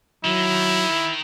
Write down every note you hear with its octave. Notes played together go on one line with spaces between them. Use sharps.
D#3 F#3 E4